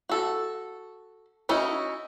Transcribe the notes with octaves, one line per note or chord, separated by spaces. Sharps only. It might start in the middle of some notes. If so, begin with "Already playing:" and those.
F#4 A4
C#4 D#4 E4 F#4